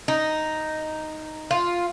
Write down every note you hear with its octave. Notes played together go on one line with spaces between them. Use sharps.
D#4
F4